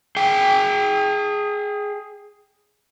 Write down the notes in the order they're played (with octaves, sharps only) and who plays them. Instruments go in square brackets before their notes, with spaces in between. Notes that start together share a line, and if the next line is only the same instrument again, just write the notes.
[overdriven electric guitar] G#4 G5